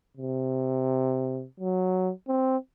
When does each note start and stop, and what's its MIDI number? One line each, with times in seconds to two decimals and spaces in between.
0.17 1.46 48
1.60 2.12 54
2.28 2.57 60